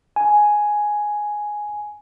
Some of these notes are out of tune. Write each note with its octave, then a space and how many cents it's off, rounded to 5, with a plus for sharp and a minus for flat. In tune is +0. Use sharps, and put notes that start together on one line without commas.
G#5 +5